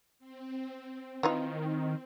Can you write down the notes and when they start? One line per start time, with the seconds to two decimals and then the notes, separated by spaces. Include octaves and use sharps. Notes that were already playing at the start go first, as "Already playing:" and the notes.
0.19 C4
1.23 D#3 E3 D#4 F4